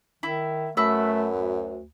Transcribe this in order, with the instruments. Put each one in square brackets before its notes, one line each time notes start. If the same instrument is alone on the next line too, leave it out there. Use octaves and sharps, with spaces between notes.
[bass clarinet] D#3 [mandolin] E4
[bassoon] F#2 [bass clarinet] A3 [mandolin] F#4 B4 E6
[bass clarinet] D2